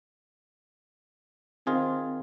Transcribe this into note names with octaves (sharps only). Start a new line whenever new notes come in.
D#3 C4 F4 G#4